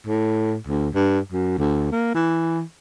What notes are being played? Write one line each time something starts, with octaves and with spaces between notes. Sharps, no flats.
A2
D2
G2
F#2
D2
A#3
E3